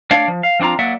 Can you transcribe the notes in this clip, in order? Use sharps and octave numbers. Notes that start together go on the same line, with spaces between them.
A3 D4 C#5 D5 F5
F3
F5
F3 C4 D4 F4 A#5
F#3 A#3 D5 E5 F#5